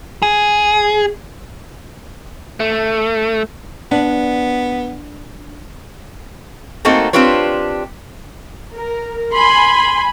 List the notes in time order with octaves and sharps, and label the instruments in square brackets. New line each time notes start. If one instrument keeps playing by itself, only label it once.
[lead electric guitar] G#4
A3
[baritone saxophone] B3 [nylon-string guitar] D4
[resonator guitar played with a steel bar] A3 A#3 C4 D#4 F#4 A4
C4 D4 F4 G4 B4 C#5
[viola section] A#4
[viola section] G#5 B5 [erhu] C6